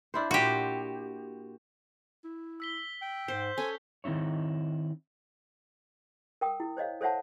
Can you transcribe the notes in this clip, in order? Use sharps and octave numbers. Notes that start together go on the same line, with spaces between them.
D4 E4 C5
A#2 F#4 G4 C5
E4
E6 B6 G7
G5
G#2 C5 G6
C#4 A4 G#5
D#3 C4 D#4 E4 C#5
A#4 G5 D#6
E4
C5 C#5 D#5 F5
A4 C5 C#5 E5 F#5 A5